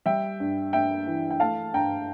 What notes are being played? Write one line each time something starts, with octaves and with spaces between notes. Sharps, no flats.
G3 E5 G5
G2
G2 E5 G5
E3
G5
A3 F5 A5
G2 G5 A#5